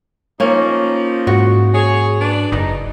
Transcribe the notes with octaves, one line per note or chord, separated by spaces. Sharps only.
F3 A#3 C#4 D#4
G#2 F#4
G#4 C#5
D4 B4 D5
F#1 D#4